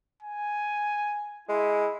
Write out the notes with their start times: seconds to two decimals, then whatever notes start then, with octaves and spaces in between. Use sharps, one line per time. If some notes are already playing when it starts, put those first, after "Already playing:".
0.22 G#5
1.49 G#3 E4